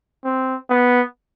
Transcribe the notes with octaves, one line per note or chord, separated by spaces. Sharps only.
C4
B3